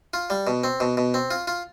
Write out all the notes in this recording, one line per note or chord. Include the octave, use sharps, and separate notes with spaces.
F4
G3
B2
C4
B2
B2
C4
F4
F4